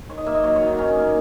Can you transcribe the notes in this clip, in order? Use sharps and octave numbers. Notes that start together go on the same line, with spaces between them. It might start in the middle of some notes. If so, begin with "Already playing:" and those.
D#3 C#5
D#5
A#3 E5
D#5
F#3 C#5
C#5
D#3
D#4
D#3 C#4
A#3